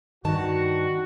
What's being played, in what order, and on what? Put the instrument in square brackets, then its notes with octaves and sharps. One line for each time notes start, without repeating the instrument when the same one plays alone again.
[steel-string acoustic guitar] G2 D#3 A5 [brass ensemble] F#4